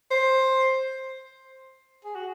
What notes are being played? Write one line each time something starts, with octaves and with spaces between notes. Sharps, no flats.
C5
G#4
F#4